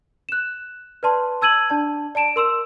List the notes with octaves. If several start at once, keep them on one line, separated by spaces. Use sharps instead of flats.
F#6 E7
B4 D5 A5 C6
A5 E6 G#6 D#7 F#7
D4 D5 A5
D5 A5 D7 E7
A#4 C6 E6 E7